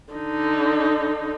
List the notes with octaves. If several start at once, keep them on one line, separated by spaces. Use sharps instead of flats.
D3 D#4